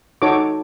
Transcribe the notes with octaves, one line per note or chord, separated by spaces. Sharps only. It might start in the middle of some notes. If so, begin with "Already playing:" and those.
D#4 F#4 A4 C#5 D6